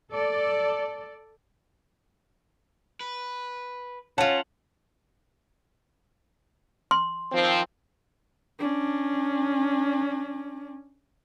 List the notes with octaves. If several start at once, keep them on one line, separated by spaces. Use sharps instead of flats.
A4 D5
B4
C#4 F4 F#5 A5
C6
D#3 F3 C4
C#4 D4